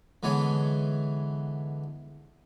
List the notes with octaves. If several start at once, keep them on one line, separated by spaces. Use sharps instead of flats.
D3 E3 G#3 B3 C#5